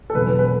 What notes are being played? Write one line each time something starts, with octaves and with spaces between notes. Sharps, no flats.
A4
E1 E2 B2 F#3 B4
B4